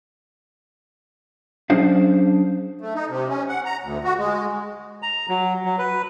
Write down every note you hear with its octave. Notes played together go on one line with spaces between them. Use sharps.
F#3 C#4 D4 G#4 C5 F5
A3
D#4
C3
C#4
F#5
A#5
D2
F#4
G#3
A#5
F#3
F#3
B4